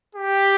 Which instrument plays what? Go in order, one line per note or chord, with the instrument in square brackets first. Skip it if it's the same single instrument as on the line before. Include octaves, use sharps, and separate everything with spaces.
[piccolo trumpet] G4